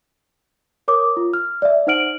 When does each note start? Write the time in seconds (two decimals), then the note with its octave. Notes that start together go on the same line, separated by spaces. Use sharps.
0.88 A#4 C#5 D6 D#6
1.17 F4
1.34 F6
1.62 D5 E5
1.87 D#4 C5 F#5 F6 D7 F#7